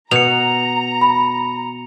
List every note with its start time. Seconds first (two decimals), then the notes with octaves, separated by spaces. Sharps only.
0.11 B2 A#5 C#7 F7
1.01 B5